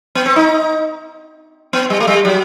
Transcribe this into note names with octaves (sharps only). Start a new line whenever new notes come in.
B3
C4
D#4
B3
G3
A3
G3
F#3